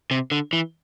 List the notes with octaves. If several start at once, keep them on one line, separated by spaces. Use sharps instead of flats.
C3
D3
E3